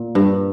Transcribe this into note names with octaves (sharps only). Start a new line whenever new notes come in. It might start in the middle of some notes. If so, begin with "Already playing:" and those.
Already playing: A#2
G2